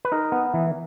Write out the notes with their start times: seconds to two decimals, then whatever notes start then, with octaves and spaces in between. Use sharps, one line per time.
0.05 B4
0.12 D#4 A#4
0.32 B3
0.54 E3